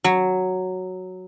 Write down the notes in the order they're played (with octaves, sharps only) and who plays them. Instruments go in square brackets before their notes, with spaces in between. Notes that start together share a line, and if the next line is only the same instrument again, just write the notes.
[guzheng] F#3